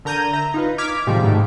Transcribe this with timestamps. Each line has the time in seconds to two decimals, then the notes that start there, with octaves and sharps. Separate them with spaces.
0.05 D3 A#4 A#5 G6 G#6 D#7
0.33 E5 A#5
0.54 D#4 F4 B4
0.78 D6 F6 G#6 B6
1.07 A2 C3 D#3 F3 G3 G#3
1.23 G#2 G3 A3